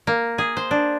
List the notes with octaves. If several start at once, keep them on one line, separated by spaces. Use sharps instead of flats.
A#3
G#4
C5
D4